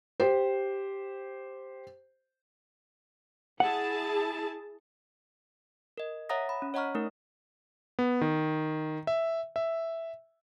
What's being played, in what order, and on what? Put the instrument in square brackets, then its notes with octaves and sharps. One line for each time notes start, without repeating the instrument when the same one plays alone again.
[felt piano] G4 C5
[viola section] E4 G#4 A5 [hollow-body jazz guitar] F#5
[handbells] A#4 D#5
C#5 E5 F#5 A#5 D#6 A#6
B5
C#4
C#5 D#5 F#5 A#5 C#6 F6
A3 D#4 A#4
[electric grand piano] B3
D#3
E5
E5